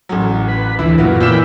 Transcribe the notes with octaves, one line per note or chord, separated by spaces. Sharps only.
A1 F#3
B4
D2 E3 E4
F#2 A#2 B3 F4
A#2 E3 E4 G5 B5 E7